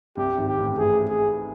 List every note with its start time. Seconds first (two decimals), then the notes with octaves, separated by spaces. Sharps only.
0.17 C2 C3 G4
0.38 G#1 G#2
0.48 G4
0.58 A1 A2
0.78 A1 A2 G#4
1.08 G#4